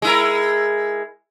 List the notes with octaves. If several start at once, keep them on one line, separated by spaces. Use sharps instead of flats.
G#3 E4 A#4